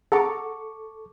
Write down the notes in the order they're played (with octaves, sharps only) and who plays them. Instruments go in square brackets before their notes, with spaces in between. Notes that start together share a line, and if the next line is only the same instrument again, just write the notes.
[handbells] G#4 F#5 A#5 [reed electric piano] A4 C#6 D6